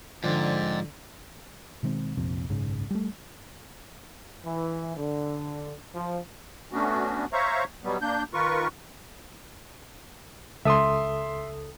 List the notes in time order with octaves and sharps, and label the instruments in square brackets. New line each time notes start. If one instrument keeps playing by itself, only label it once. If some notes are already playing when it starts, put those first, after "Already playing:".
[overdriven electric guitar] G#2 [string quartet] D3 [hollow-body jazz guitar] F3 [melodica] C4 D5
[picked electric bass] B2 D#3 G#3 C4
F1 A#1 F2 C3
F#1 B1 G#2 C#3
G3 A3
[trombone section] E3
D3
F3
[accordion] A3 B3 C#4 D4 F#4
C5 C#5 E5 F5 A#5 C#6
B2 F#3 G3 B3
A#3 D4 G6
D#3 F4 A#4 B4 C#6
[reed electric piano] C#2 A4 D#6 [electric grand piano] E5 C6